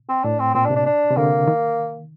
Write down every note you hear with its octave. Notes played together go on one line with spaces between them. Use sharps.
C4
A2 D4
C4
A#2 C4
D4
C3
D4
D4
C3
D3 A#3
D#3